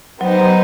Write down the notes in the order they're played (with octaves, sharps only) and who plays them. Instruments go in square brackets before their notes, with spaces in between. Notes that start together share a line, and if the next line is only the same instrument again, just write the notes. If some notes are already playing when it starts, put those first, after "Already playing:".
[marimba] F#3 [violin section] B3 D#4 G4 C5
[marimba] F#3